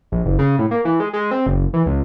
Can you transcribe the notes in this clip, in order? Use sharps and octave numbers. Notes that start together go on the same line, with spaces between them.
A#1
F#1
C#3
A2
A#3
E3
G#3
G#3
C4
F#1
E3
C#2